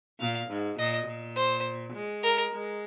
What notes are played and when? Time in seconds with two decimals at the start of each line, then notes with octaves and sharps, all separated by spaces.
0.20 A#2 F5
0.49 G#2
0.78 A#2 D#5
1.07 A#2
1.36 C5
1.93 G#3
2.23 A#4
2.51 G#3